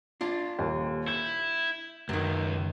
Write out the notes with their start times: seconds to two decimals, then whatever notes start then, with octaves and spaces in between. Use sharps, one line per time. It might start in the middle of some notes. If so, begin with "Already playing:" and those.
0.21 D4 F4
0.59 D#1 D#2
1.08 E4 G6
2.09 C#2 F#2 D#3